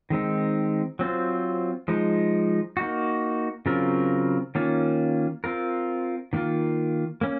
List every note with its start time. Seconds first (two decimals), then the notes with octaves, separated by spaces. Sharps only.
0.10 D#3 G#3 C4 D#4
0.99 F#3 C4 F4 C5
1.88 F3 G#3 D#4
2.77 A#3 D#4 F#4
3.66 C#3 F#3 C4 F4 A#4
4.55 D#3 A#3 C#4 F4
5.44 C4 F4 A#4
6.33 D#3 A#3 F4
7.21 A#3 C#4